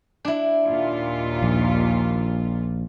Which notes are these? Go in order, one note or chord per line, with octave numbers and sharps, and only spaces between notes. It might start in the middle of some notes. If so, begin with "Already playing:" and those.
D4 E4
D#2 A#2 F4
A#1